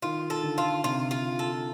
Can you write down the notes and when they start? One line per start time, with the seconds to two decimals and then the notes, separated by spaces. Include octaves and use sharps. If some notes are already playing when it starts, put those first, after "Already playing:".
0.02 D#3 F4
0.30 A4
0.43 D3
0.58 F4
0.84 C3 F4
1.11 F4
1.39 A4